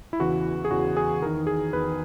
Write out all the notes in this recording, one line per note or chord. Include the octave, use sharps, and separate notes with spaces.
E4
E2 C#3 E3 F#4
G#4
E2 C#3 E3 F#4
G#4
E2 D#3 A#4
G#4
E2 D#3 B4